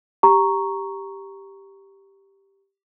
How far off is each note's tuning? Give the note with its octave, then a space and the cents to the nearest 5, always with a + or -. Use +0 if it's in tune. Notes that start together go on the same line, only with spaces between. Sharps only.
G4 +0 A#5 +0 C#6 +0